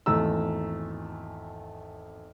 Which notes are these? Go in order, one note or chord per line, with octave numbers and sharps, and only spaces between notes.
G#1 E2 A3 A#5 E6